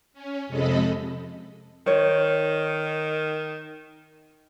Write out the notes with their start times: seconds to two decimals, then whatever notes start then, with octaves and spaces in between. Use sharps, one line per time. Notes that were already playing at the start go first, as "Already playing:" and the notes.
0.13 C#4
0.47 F2 C3 G#3 A4 D#5 B5
1.86 D#3 C5 C#5